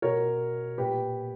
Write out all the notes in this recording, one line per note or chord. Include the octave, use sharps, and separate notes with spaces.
B2 A#4 C#5
A#2 G4 B4